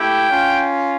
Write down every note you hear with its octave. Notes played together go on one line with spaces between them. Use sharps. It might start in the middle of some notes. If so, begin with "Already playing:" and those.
Already playing: A3 E4 G4 G5
C#4 F4